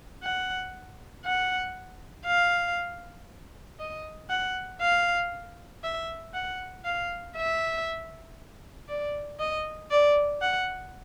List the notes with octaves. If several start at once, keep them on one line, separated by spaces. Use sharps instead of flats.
F#5
F#5
F5
D#5
F#5
F5
E5
F#5
F5
E5
D5
D#5
D5
F#5